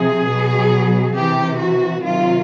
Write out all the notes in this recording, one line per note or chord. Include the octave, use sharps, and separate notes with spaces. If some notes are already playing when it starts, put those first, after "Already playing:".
Already playing: C3 F3 G#4
B2 F#3
C3 E3 G4
F#4
C3 D#3 F#3 F4